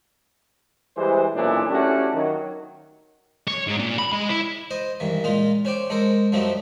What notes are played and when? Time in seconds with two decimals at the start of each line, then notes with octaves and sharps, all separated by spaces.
0.96 E3 G3 G#3 C5
1.35 B1 A#2 E3 C#4 D4 E4
1.70 A3 C#4 D4 E4 F#4 G4
2.14 D#3 F#3
3.48 C#5
3.67 G#2
3.79 A#2
3.99 B5
4.12 G#3
4.29 E4
4.71 C5 D#5
5.00 G2 D#3 E3
5.24 A#2 G#3 D#4 F4
5.65 C#4 C5 D5 G5
5.90 G#3 A4 A#4 C5
6.32 F#2 F3 G3 A3 C4 D#4